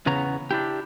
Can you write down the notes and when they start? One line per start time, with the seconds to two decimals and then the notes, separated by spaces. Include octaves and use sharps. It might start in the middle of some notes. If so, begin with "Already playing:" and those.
0.06 E2 C#3 B3 C#5 A#5
0.51 D4 E4 G4